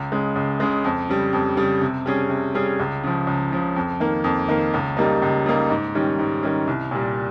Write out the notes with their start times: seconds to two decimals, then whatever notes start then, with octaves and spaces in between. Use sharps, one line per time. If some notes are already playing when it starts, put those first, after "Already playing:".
Already playing: C#2
0.12 C#3 G#3
0.36 C#2
0.60 C#3 G#3
0.84 F2
1.09 C#3 G3
1.33 F2
1.57 C#3 G3
1.81 C3
2.06 G3 C#4 G#4
2.29 C3
2.55 G3 C#4 G#4
2.79 C#2
3.03 C#3 F3
3.27 C#2
3.52 C#3 F3
3.76 F2
4.00 D#3 A#3
4.24 F2
4.48 D#3 A#3
4.74 C#2
4.97 C#3 G3 A#3 D#4
5.22 C#2
5.46 C#3 G3 A#3 D#4
5.70 G#2
5.95 D#3 G3 C#4
6.19 G#2
6.43 D#3 G3 C#4
6.67 C2
6.91 A#2 G3